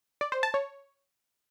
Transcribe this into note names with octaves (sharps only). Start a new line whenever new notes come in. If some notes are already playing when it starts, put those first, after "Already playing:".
D5
C5
A5
C#5